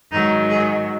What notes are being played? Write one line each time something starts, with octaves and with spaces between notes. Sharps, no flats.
G#2 D#3 F#3 D#4
G#4